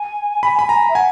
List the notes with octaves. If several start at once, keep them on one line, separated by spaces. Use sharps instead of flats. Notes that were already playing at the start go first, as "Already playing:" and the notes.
Already playing: G#5
B5
B5
A#5
E5
F#5 G#5